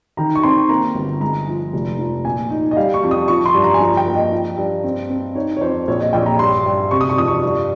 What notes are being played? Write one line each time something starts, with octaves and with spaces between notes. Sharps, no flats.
D#3 A#5
C#6
C4 C6
A#3 A#5
G1
G#3 A#5
F3
F1
F3
A#2 G#5
D#4
D#5
G3 F5
C#6
F2
D#6
F3 C#6
C6
G2
A#5
G#5
F3 A#5
G5
A#3
D#5
F3
G2
C4
C4
D#4 C#5
C#5
F2 C5
A#1 C#5
D#5
A#1 G5
A#5
G2 C6
G2
C3 C#6
D#6
C#6
F2 D#6
C#6
G2